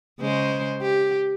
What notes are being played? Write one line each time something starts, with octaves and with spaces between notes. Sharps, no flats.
C#3 G#3 C5
G4